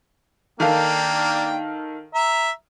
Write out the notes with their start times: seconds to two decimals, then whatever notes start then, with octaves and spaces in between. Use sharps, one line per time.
0.60 D#3 A#3 D4 A4 F5 G5
2.15 E5 A#5